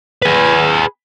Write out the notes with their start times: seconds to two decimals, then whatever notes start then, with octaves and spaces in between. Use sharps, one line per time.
0.22 G#4 B4